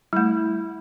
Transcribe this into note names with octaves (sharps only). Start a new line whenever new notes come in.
G3 A3 E4